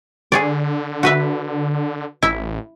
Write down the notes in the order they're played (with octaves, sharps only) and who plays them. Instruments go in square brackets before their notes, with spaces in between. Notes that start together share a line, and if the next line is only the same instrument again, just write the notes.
[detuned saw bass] D3 [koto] G#4 C#5 D5
[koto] F#4 B4 E5
[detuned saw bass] A1 [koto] E4 E5